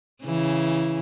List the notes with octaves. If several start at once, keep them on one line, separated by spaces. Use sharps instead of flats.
C#3 E3